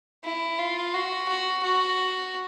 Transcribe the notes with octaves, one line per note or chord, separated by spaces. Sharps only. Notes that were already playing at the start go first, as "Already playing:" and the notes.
E4
F4
F#4
F#4
F#4